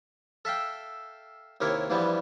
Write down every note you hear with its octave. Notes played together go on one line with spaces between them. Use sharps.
A4 E5 F5 G5
D#2 C3 A#3 E4 A#4 C#5
E2 G2 E3 F3 G3 B3